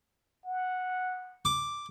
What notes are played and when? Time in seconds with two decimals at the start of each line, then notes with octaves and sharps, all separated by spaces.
0.45 F#5
1.45 D6